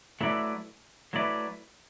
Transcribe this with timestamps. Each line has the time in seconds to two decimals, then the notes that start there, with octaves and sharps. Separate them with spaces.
0.21 F#3 A3 E4 B4 D5
1.13 F#3 A3 E4 B4 D5